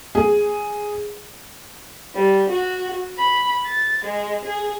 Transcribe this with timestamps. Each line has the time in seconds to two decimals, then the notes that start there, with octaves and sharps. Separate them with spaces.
0.15 G#4
2.13 G3
2.48 F#4
3.16 B5
3.65 A6
4.01 G#3
4.43 G#4